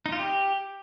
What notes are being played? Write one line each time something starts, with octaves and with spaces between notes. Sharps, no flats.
D#4
F4
G4